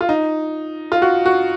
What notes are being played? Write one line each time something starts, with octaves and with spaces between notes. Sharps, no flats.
F4
D#4
F4
F#4
F#4